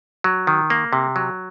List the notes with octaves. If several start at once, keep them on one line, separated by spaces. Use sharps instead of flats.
F#3
D#3
A#3
C3
F#3